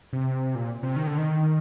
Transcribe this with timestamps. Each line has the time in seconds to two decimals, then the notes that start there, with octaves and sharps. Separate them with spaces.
0.13 C3
0.55 A#2
0.83 C3
0.96 D#3
1.07 D3
1.18 D#3